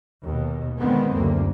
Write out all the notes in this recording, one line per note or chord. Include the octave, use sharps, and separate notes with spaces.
D#2 B2
D3 D#3 G#3 B3 C4
F#1 D2 A#3